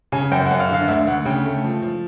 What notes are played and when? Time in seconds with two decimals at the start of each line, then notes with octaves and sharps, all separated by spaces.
0.12 C#3 G#5
0.32 F#2 G5
0.46 F#5
0.51 F#2
0.60 F5
0.69 D3
0.74 F5
0.88 D2 E5
1.07 D2 F#5
1.25 C#3 G5
1.45 A3
1.64 F3
1.82 F3